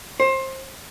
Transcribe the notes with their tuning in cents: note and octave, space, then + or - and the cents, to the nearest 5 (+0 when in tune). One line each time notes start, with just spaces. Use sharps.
C5 +25